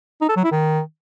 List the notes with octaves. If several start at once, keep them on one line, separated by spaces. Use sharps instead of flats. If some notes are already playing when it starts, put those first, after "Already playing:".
D#4
A4
F#3
E4
D#3